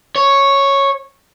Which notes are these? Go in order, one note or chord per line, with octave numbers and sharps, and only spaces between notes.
C#5